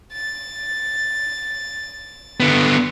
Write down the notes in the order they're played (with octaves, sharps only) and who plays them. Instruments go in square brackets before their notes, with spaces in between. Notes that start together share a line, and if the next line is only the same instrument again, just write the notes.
[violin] A6
[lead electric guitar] D3 B3